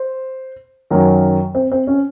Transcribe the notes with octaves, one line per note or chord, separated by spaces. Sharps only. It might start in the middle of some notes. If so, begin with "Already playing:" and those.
Already playing: C5
F#2 D#3 F#3 A#4
C4
C4
C#4